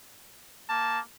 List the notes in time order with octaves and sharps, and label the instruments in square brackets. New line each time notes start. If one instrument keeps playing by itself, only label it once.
[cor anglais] A#3 [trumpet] A5